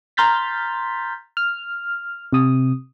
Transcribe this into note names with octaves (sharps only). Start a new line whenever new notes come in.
A#5 C6 F6 G6 A6 B6
F6
C3 D#6